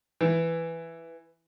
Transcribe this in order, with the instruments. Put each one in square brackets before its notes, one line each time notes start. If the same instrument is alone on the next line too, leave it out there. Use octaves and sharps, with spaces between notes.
[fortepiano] E3